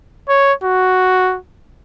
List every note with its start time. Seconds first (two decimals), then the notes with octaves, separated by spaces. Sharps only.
0.29 C#5
0.63 F#4